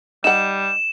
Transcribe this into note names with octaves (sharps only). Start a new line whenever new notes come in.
G3 D#4 F#5 E7